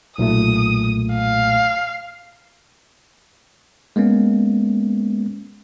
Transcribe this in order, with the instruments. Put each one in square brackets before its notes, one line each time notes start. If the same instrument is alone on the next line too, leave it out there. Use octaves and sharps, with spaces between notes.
[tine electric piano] B1 A#2 A3 [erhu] D#6
[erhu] F5
[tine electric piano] G#3 A#3 B3 C#4